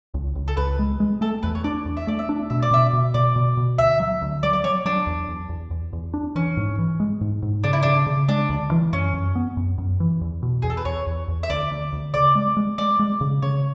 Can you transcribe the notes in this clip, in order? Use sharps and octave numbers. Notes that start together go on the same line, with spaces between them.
C#2
C#2
A4
C#2 B4
G#3
G#3
A3 A4
E2 B4
C#5
D4 D5
E2
E5
A3 D5
E5
D4
B2 E5
D5
B2 E5
B2
B2 D5
B2
B2
D2 E5
F#3
D2
F#3 D5
D5
F#3 C#5
F#3 D4
E2
E2
E2
E2
E2
D4
E3 C#4
G#2
E3
G#3
G#2
G#2
C#3 D4
E4
C#3 D4
C#3
G#3 D4
D2
E3
F#2 C#4
F#2
B3
F#2
F#2
E3
E2
B2
E2 G#4
A4
B4
E2 C#5
E2
E2
E5
D2 D5
D2
D2
C#3 D5
G#3
G#3
G#3 D5
G#3
C#3
C#3 C#5